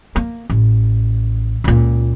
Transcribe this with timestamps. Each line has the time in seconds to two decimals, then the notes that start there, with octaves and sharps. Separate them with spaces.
0.16 A#3
0.50 A1
1.64 C#2 A#2